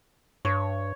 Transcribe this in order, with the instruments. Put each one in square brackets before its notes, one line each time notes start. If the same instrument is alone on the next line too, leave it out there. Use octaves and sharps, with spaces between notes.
[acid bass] G2 [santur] C#5